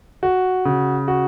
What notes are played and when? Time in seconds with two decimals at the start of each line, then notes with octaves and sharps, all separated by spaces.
0.23 F#4
0.65 C#3
1.08 F#4